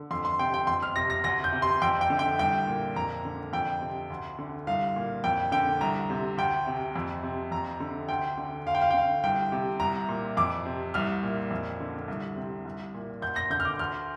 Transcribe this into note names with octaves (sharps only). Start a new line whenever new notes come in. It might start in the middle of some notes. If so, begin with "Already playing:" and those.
Already playing: D3
F2 C6
C6
C3 G5
G5
F2 C6
F6
C3 A#6
A#6
D2 A#6
G6
C3
C6
F2 G5
G5
D3
G5
C2 G5
A#2
F2 A#5
D3
F2 G5
C3
D2
D3
C2 F5
A#2
F2 G5
D3 G5
C2 A#5
C3
D2 G5
C3
F2
C3
F2 A#5
D3
D2 G5
D3
D2 F5
G5
F5
G5
D3 F5
C2 G5
C3
C2 A#5
A#2
F2 D6
C3
C2 F6
A#2
F2
D3
C2
C3
C2
A#2
D2 G6
A#6
D3 G6
F6
D6
D2 F6